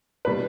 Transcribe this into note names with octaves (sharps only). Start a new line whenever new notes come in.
B2 G3 B4